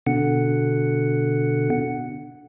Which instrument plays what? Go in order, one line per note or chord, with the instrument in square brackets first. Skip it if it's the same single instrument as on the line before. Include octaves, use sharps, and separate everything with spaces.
[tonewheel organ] B2 D3 F#5